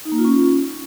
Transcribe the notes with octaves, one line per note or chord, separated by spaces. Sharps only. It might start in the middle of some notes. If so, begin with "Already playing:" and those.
D#4
A#3
F4
C#4